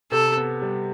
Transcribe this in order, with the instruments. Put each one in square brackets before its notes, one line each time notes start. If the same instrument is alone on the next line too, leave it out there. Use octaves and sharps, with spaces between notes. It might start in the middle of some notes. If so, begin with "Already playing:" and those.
[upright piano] C3 [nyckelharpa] A4
[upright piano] B3
G3